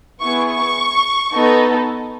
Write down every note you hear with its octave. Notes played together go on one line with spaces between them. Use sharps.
B3 E4 G#4 C#6
C#6
B3 D#4 A4